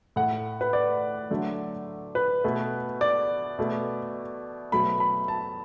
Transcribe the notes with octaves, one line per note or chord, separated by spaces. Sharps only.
A2 A3 F#5
B4
D5
D3 F#3 A3
B4
B2 A3
D5
B2 A3
B2 F#3 A3 B5
B5
A5